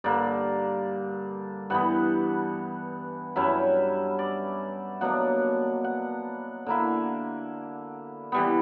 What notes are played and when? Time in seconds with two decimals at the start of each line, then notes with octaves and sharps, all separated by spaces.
0.04 G2 D3 A#3 D5
1.70 G2 E3 B3 F#5
3.36 G2 F#3 C#4 E4 E5
4.19 D5
5.01 B2 F#3 A#3 D4 F#5
5.84 F#5
6.66 D3 A#3 E4
8.32 E3 G3 B3